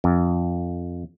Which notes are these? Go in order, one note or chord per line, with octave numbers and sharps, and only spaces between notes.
F2